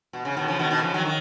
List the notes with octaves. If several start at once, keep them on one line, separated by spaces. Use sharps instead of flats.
B2
C#3
B2 D#3
C#3 F3
B2 D#3
B2 D#3
C#3 F3
D#3 F#3
D#3